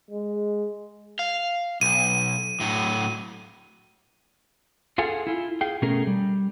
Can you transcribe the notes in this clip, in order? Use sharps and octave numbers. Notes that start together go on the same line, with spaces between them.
G#3
F5
B1 D#7
A2 F#3
F4 G#4 A4 F5 F#5 G#5
E4 F4
G#4 F5 G5
B2 A3 C#4 G#4 A#4
G3